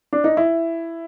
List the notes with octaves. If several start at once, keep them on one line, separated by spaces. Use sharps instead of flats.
D4
D#4
E4